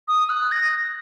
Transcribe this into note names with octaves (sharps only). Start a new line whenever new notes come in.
D#6
F#6
A#6